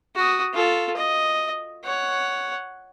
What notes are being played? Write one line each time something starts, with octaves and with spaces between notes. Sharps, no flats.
F#4 D#6
F4 A4
D#5
C#5 F#5